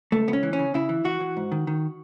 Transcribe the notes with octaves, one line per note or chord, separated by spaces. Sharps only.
C#2 A3
C#2 B3
C#4
E3
C#4
C#3
C#3 E4
E3
E3 F#4
E3
G#2
D#3
D#3